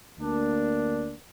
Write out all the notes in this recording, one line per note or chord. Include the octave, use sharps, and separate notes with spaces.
D2 A#3 D4